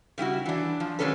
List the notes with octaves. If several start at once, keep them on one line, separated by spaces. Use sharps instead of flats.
C#3 G3 E4 F#4
E3 D4
F3
D#3 F#3 G#3 C#4 A4 B4